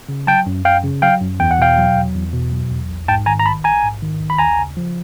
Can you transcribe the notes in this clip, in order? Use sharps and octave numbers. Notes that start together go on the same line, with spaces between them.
C#3
F#3 G5 A5
F#2
F#2 F5 G5
C#3
F#3 F5 G5
F#2
E2 G5
F#5
B2 F5 G5
F#3
E2
E2
B2
F#3
E2
A#1
G#2 G5 A5
D#3 G#5 A#5
A#5
A#1 A5 B5
A#1 G#5 A#5
G#2
D#3
A#1
B5
D#2 G#5 A#5
C#3
F3